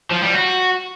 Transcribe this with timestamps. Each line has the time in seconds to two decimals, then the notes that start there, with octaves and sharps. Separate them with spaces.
0.11 F3
0.22 G3
0.33 F#4